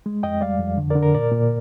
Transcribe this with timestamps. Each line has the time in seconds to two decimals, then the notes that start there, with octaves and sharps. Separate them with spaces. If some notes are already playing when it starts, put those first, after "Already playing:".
0.06 G#3
0.23 F2 D#5 G5
0.41 G3 D5 F5
0.60 F2
0.78 D3
0.90 A#4 D5
0.96 D3
1.03 A#4
1.14 A#2 A#4 D5
1.32 A#2